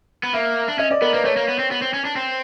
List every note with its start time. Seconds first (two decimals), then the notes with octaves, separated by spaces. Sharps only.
0.23 B3
0.33 A#3 E5
0.68 D4
0.79 C#4 D#5
0.91 D5
1.02 B3 A#4
1.14 A#3 B4
1.25 A3 C#5
1.37 A#3
1.48 B3
1.59 C4
1.71 B3
1.82 C4
1.94 C#4
2.05 D4
2.16 C4